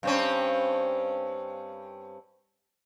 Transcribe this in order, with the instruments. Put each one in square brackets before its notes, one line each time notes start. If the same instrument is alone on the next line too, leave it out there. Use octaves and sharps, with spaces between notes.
[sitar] G2 C4 C#4